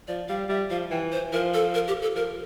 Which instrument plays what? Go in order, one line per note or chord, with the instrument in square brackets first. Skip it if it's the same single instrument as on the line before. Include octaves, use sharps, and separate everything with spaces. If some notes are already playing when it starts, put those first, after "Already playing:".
[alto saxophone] F3 [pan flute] D5
[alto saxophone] G3 [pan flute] F5
[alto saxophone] G3 [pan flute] E5
[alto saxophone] F3 [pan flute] F5
[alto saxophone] E3 [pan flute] G5
[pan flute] C5
[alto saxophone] F3 [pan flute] A#4
[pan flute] A4
A#4
G4
A4
[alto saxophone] F3 [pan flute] A#4